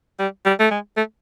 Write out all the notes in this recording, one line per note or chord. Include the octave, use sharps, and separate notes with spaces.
G3
G3
A3
G#3
A3